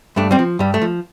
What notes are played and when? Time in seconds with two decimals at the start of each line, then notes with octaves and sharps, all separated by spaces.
0.16 G2 A3 D4
0.31 G3 C4
0.39 F3
0.59 G2 G3
0.74 A3
0.82 F3